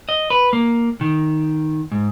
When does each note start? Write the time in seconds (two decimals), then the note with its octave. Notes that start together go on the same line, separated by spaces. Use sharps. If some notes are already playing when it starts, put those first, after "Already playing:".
0.09 D#5
0.30 B4
0.53 A#3
1.01 D#3
1.92 G#2